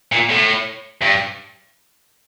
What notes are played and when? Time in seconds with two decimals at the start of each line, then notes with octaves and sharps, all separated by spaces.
0.12 A#2
0.30 A2
1.02 G2